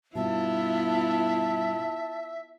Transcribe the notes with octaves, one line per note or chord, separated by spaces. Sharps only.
G2 B2 B3 E4 F4 E5 A5